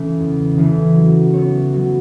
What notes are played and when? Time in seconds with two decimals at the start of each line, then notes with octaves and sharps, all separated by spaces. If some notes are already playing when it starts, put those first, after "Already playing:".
Already playing: C#3 E3 A3
0.19 E2
0.58 C#3 E3 A3
0.95 F#3
1.34 B3 E4 C#5
1.73 F#3